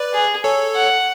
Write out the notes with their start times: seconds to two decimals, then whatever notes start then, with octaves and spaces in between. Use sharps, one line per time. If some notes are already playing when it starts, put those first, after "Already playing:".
Already playing: B4 D5
0.14 G#4
0.44 A4 C#5
0.75 F#5